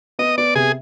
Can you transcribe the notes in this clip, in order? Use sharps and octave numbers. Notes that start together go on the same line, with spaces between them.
B3 D#5
B3 D5
C3 G#4